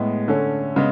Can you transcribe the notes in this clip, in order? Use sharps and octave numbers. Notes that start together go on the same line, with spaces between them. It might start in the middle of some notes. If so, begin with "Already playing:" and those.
Already playing: A2 G#3 B3
D3 A3 C#4
C#3 G#3 B3